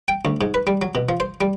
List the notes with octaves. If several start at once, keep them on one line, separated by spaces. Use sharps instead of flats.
G5
D2
G#2
B4
G3
F#3
B2
F3
C5
G3